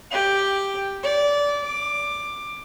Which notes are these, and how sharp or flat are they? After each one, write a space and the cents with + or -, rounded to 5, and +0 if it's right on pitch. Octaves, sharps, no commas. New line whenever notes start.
G4 +0
D5 -20
D6 +15